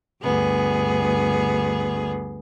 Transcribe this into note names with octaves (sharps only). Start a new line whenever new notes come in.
D2 G2 B3 G#4